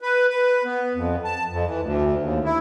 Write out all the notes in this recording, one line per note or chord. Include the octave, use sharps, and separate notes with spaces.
B4
B4
B3
F2
A5
F2
E3
D2
D#2
E4